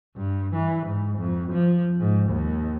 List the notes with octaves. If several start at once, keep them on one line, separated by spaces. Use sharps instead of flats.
G2
E3
G#2
F2
F3
G#2
D#2